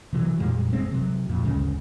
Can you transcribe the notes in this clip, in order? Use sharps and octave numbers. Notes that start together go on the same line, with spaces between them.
C3 E3 F#3
F2 A#2 G3 G#3
F#1 G#3 C4
C3 F#3
F2 A#2
G1 D2 C#3 G#3